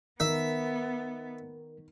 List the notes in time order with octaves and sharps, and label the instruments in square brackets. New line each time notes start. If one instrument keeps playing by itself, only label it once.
[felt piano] D#3 [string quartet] B3 [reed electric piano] A#4 [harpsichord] E5